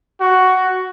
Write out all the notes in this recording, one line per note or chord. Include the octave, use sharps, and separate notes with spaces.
F#4